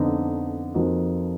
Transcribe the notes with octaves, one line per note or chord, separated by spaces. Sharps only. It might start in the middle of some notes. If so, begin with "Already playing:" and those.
Already playing: F2 D3 F3 B3 D#4
F2 F3 A#3 D#4 F#4